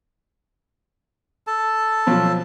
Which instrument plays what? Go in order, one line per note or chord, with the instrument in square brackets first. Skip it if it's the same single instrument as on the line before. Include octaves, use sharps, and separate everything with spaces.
[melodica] A4 A5
[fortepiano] B2 F3 F#3